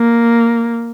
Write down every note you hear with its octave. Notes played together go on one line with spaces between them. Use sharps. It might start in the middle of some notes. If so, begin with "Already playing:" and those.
Already playing: A#3